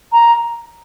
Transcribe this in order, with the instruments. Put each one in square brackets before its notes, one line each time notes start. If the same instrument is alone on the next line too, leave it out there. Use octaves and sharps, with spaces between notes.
[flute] A#5